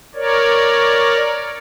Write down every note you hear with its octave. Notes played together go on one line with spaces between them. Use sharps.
A#4 C#5 D5